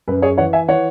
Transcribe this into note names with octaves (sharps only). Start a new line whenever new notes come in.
F#2 B4
G#4 C#5
E3 C#5 F#5
E5 G#5
E3 C#5 F#5